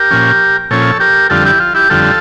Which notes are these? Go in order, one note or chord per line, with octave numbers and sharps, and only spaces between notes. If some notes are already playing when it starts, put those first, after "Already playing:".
Already playing: G4 A#4
A#2 F3 C#4
A#2 F3 C#4 A4 C#5
G4 A#4
F2 D3 G3 F4 A4
E4 G4
F4
E4 G4
F2 D3 G3 F4 A4